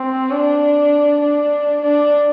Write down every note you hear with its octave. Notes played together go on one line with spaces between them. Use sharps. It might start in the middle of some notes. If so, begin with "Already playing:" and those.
Already playing: C4
D4
D4
D4